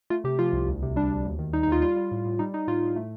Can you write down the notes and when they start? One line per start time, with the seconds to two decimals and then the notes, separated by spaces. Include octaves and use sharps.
0.10 A3 F4
0.24 C3 G4
0.39 F3 F4
0.53 C2
0.68 D2
0.83 C3
0.96 G3 D4
1.11 D2
1.25 D#2
1.39 D#3
1.53 G3 D#4
1.63 D#4
1.68 D#2 F4
1.82 G3 F4
1.96 G3
2.11 A2
2.25 A2
2.39 G3 D#4
2.54 G3 D#4
2.68 A2 F4
2.83 A2
2.96 A3